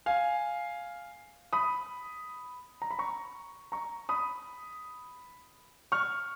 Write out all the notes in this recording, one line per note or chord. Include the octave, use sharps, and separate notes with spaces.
F5 G#5
B5 D#6
A#5
B5
A#5 C#6
A#5 C#6
B5 D#6
C#6 F6